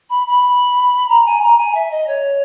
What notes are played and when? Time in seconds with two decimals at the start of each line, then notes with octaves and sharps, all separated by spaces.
0.10 B5
0.27 B5
1.08 A#5
1.26 G#5
1.42 A#5
1.58 G#5
1.75 E5
1.91 D#5
2.07 C#5